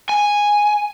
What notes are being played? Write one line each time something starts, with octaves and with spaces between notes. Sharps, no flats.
G#5